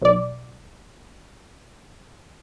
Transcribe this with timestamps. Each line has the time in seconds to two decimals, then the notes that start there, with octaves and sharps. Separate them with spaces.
0.02 B1 D5